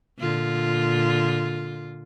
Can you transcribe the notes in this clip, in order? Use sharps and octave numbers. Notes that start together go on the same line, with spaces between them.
A#2 D3 F4